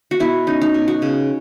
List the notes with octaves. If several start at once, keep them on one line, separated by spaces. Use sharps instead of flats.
F#4
B2 E4
C#4 D#4
D#4
B2
F#4
C#3